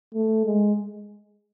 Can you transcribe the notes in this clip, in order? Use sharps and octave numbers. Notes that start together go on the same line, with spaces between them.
A3
G#3